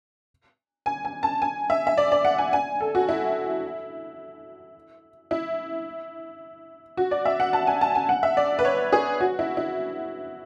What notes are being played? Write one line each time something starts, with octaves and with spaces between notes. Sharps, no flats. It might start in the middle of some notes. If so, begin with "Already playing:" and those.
G#5
G#5
A5
G#5
E5
E5
D5
D5
F#5
G#5
G#5
A4
F#4
E4
E4
F#4
D5
E5
F#5
A5
G#5
A5
G#5
F#5
E5
D5
B4
C#5
G#4
F#4
E4
E4